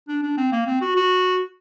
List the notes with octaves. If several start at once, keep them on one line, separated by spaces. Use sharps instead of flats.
D4
D4
C4
A#3
C4
F#4
F#4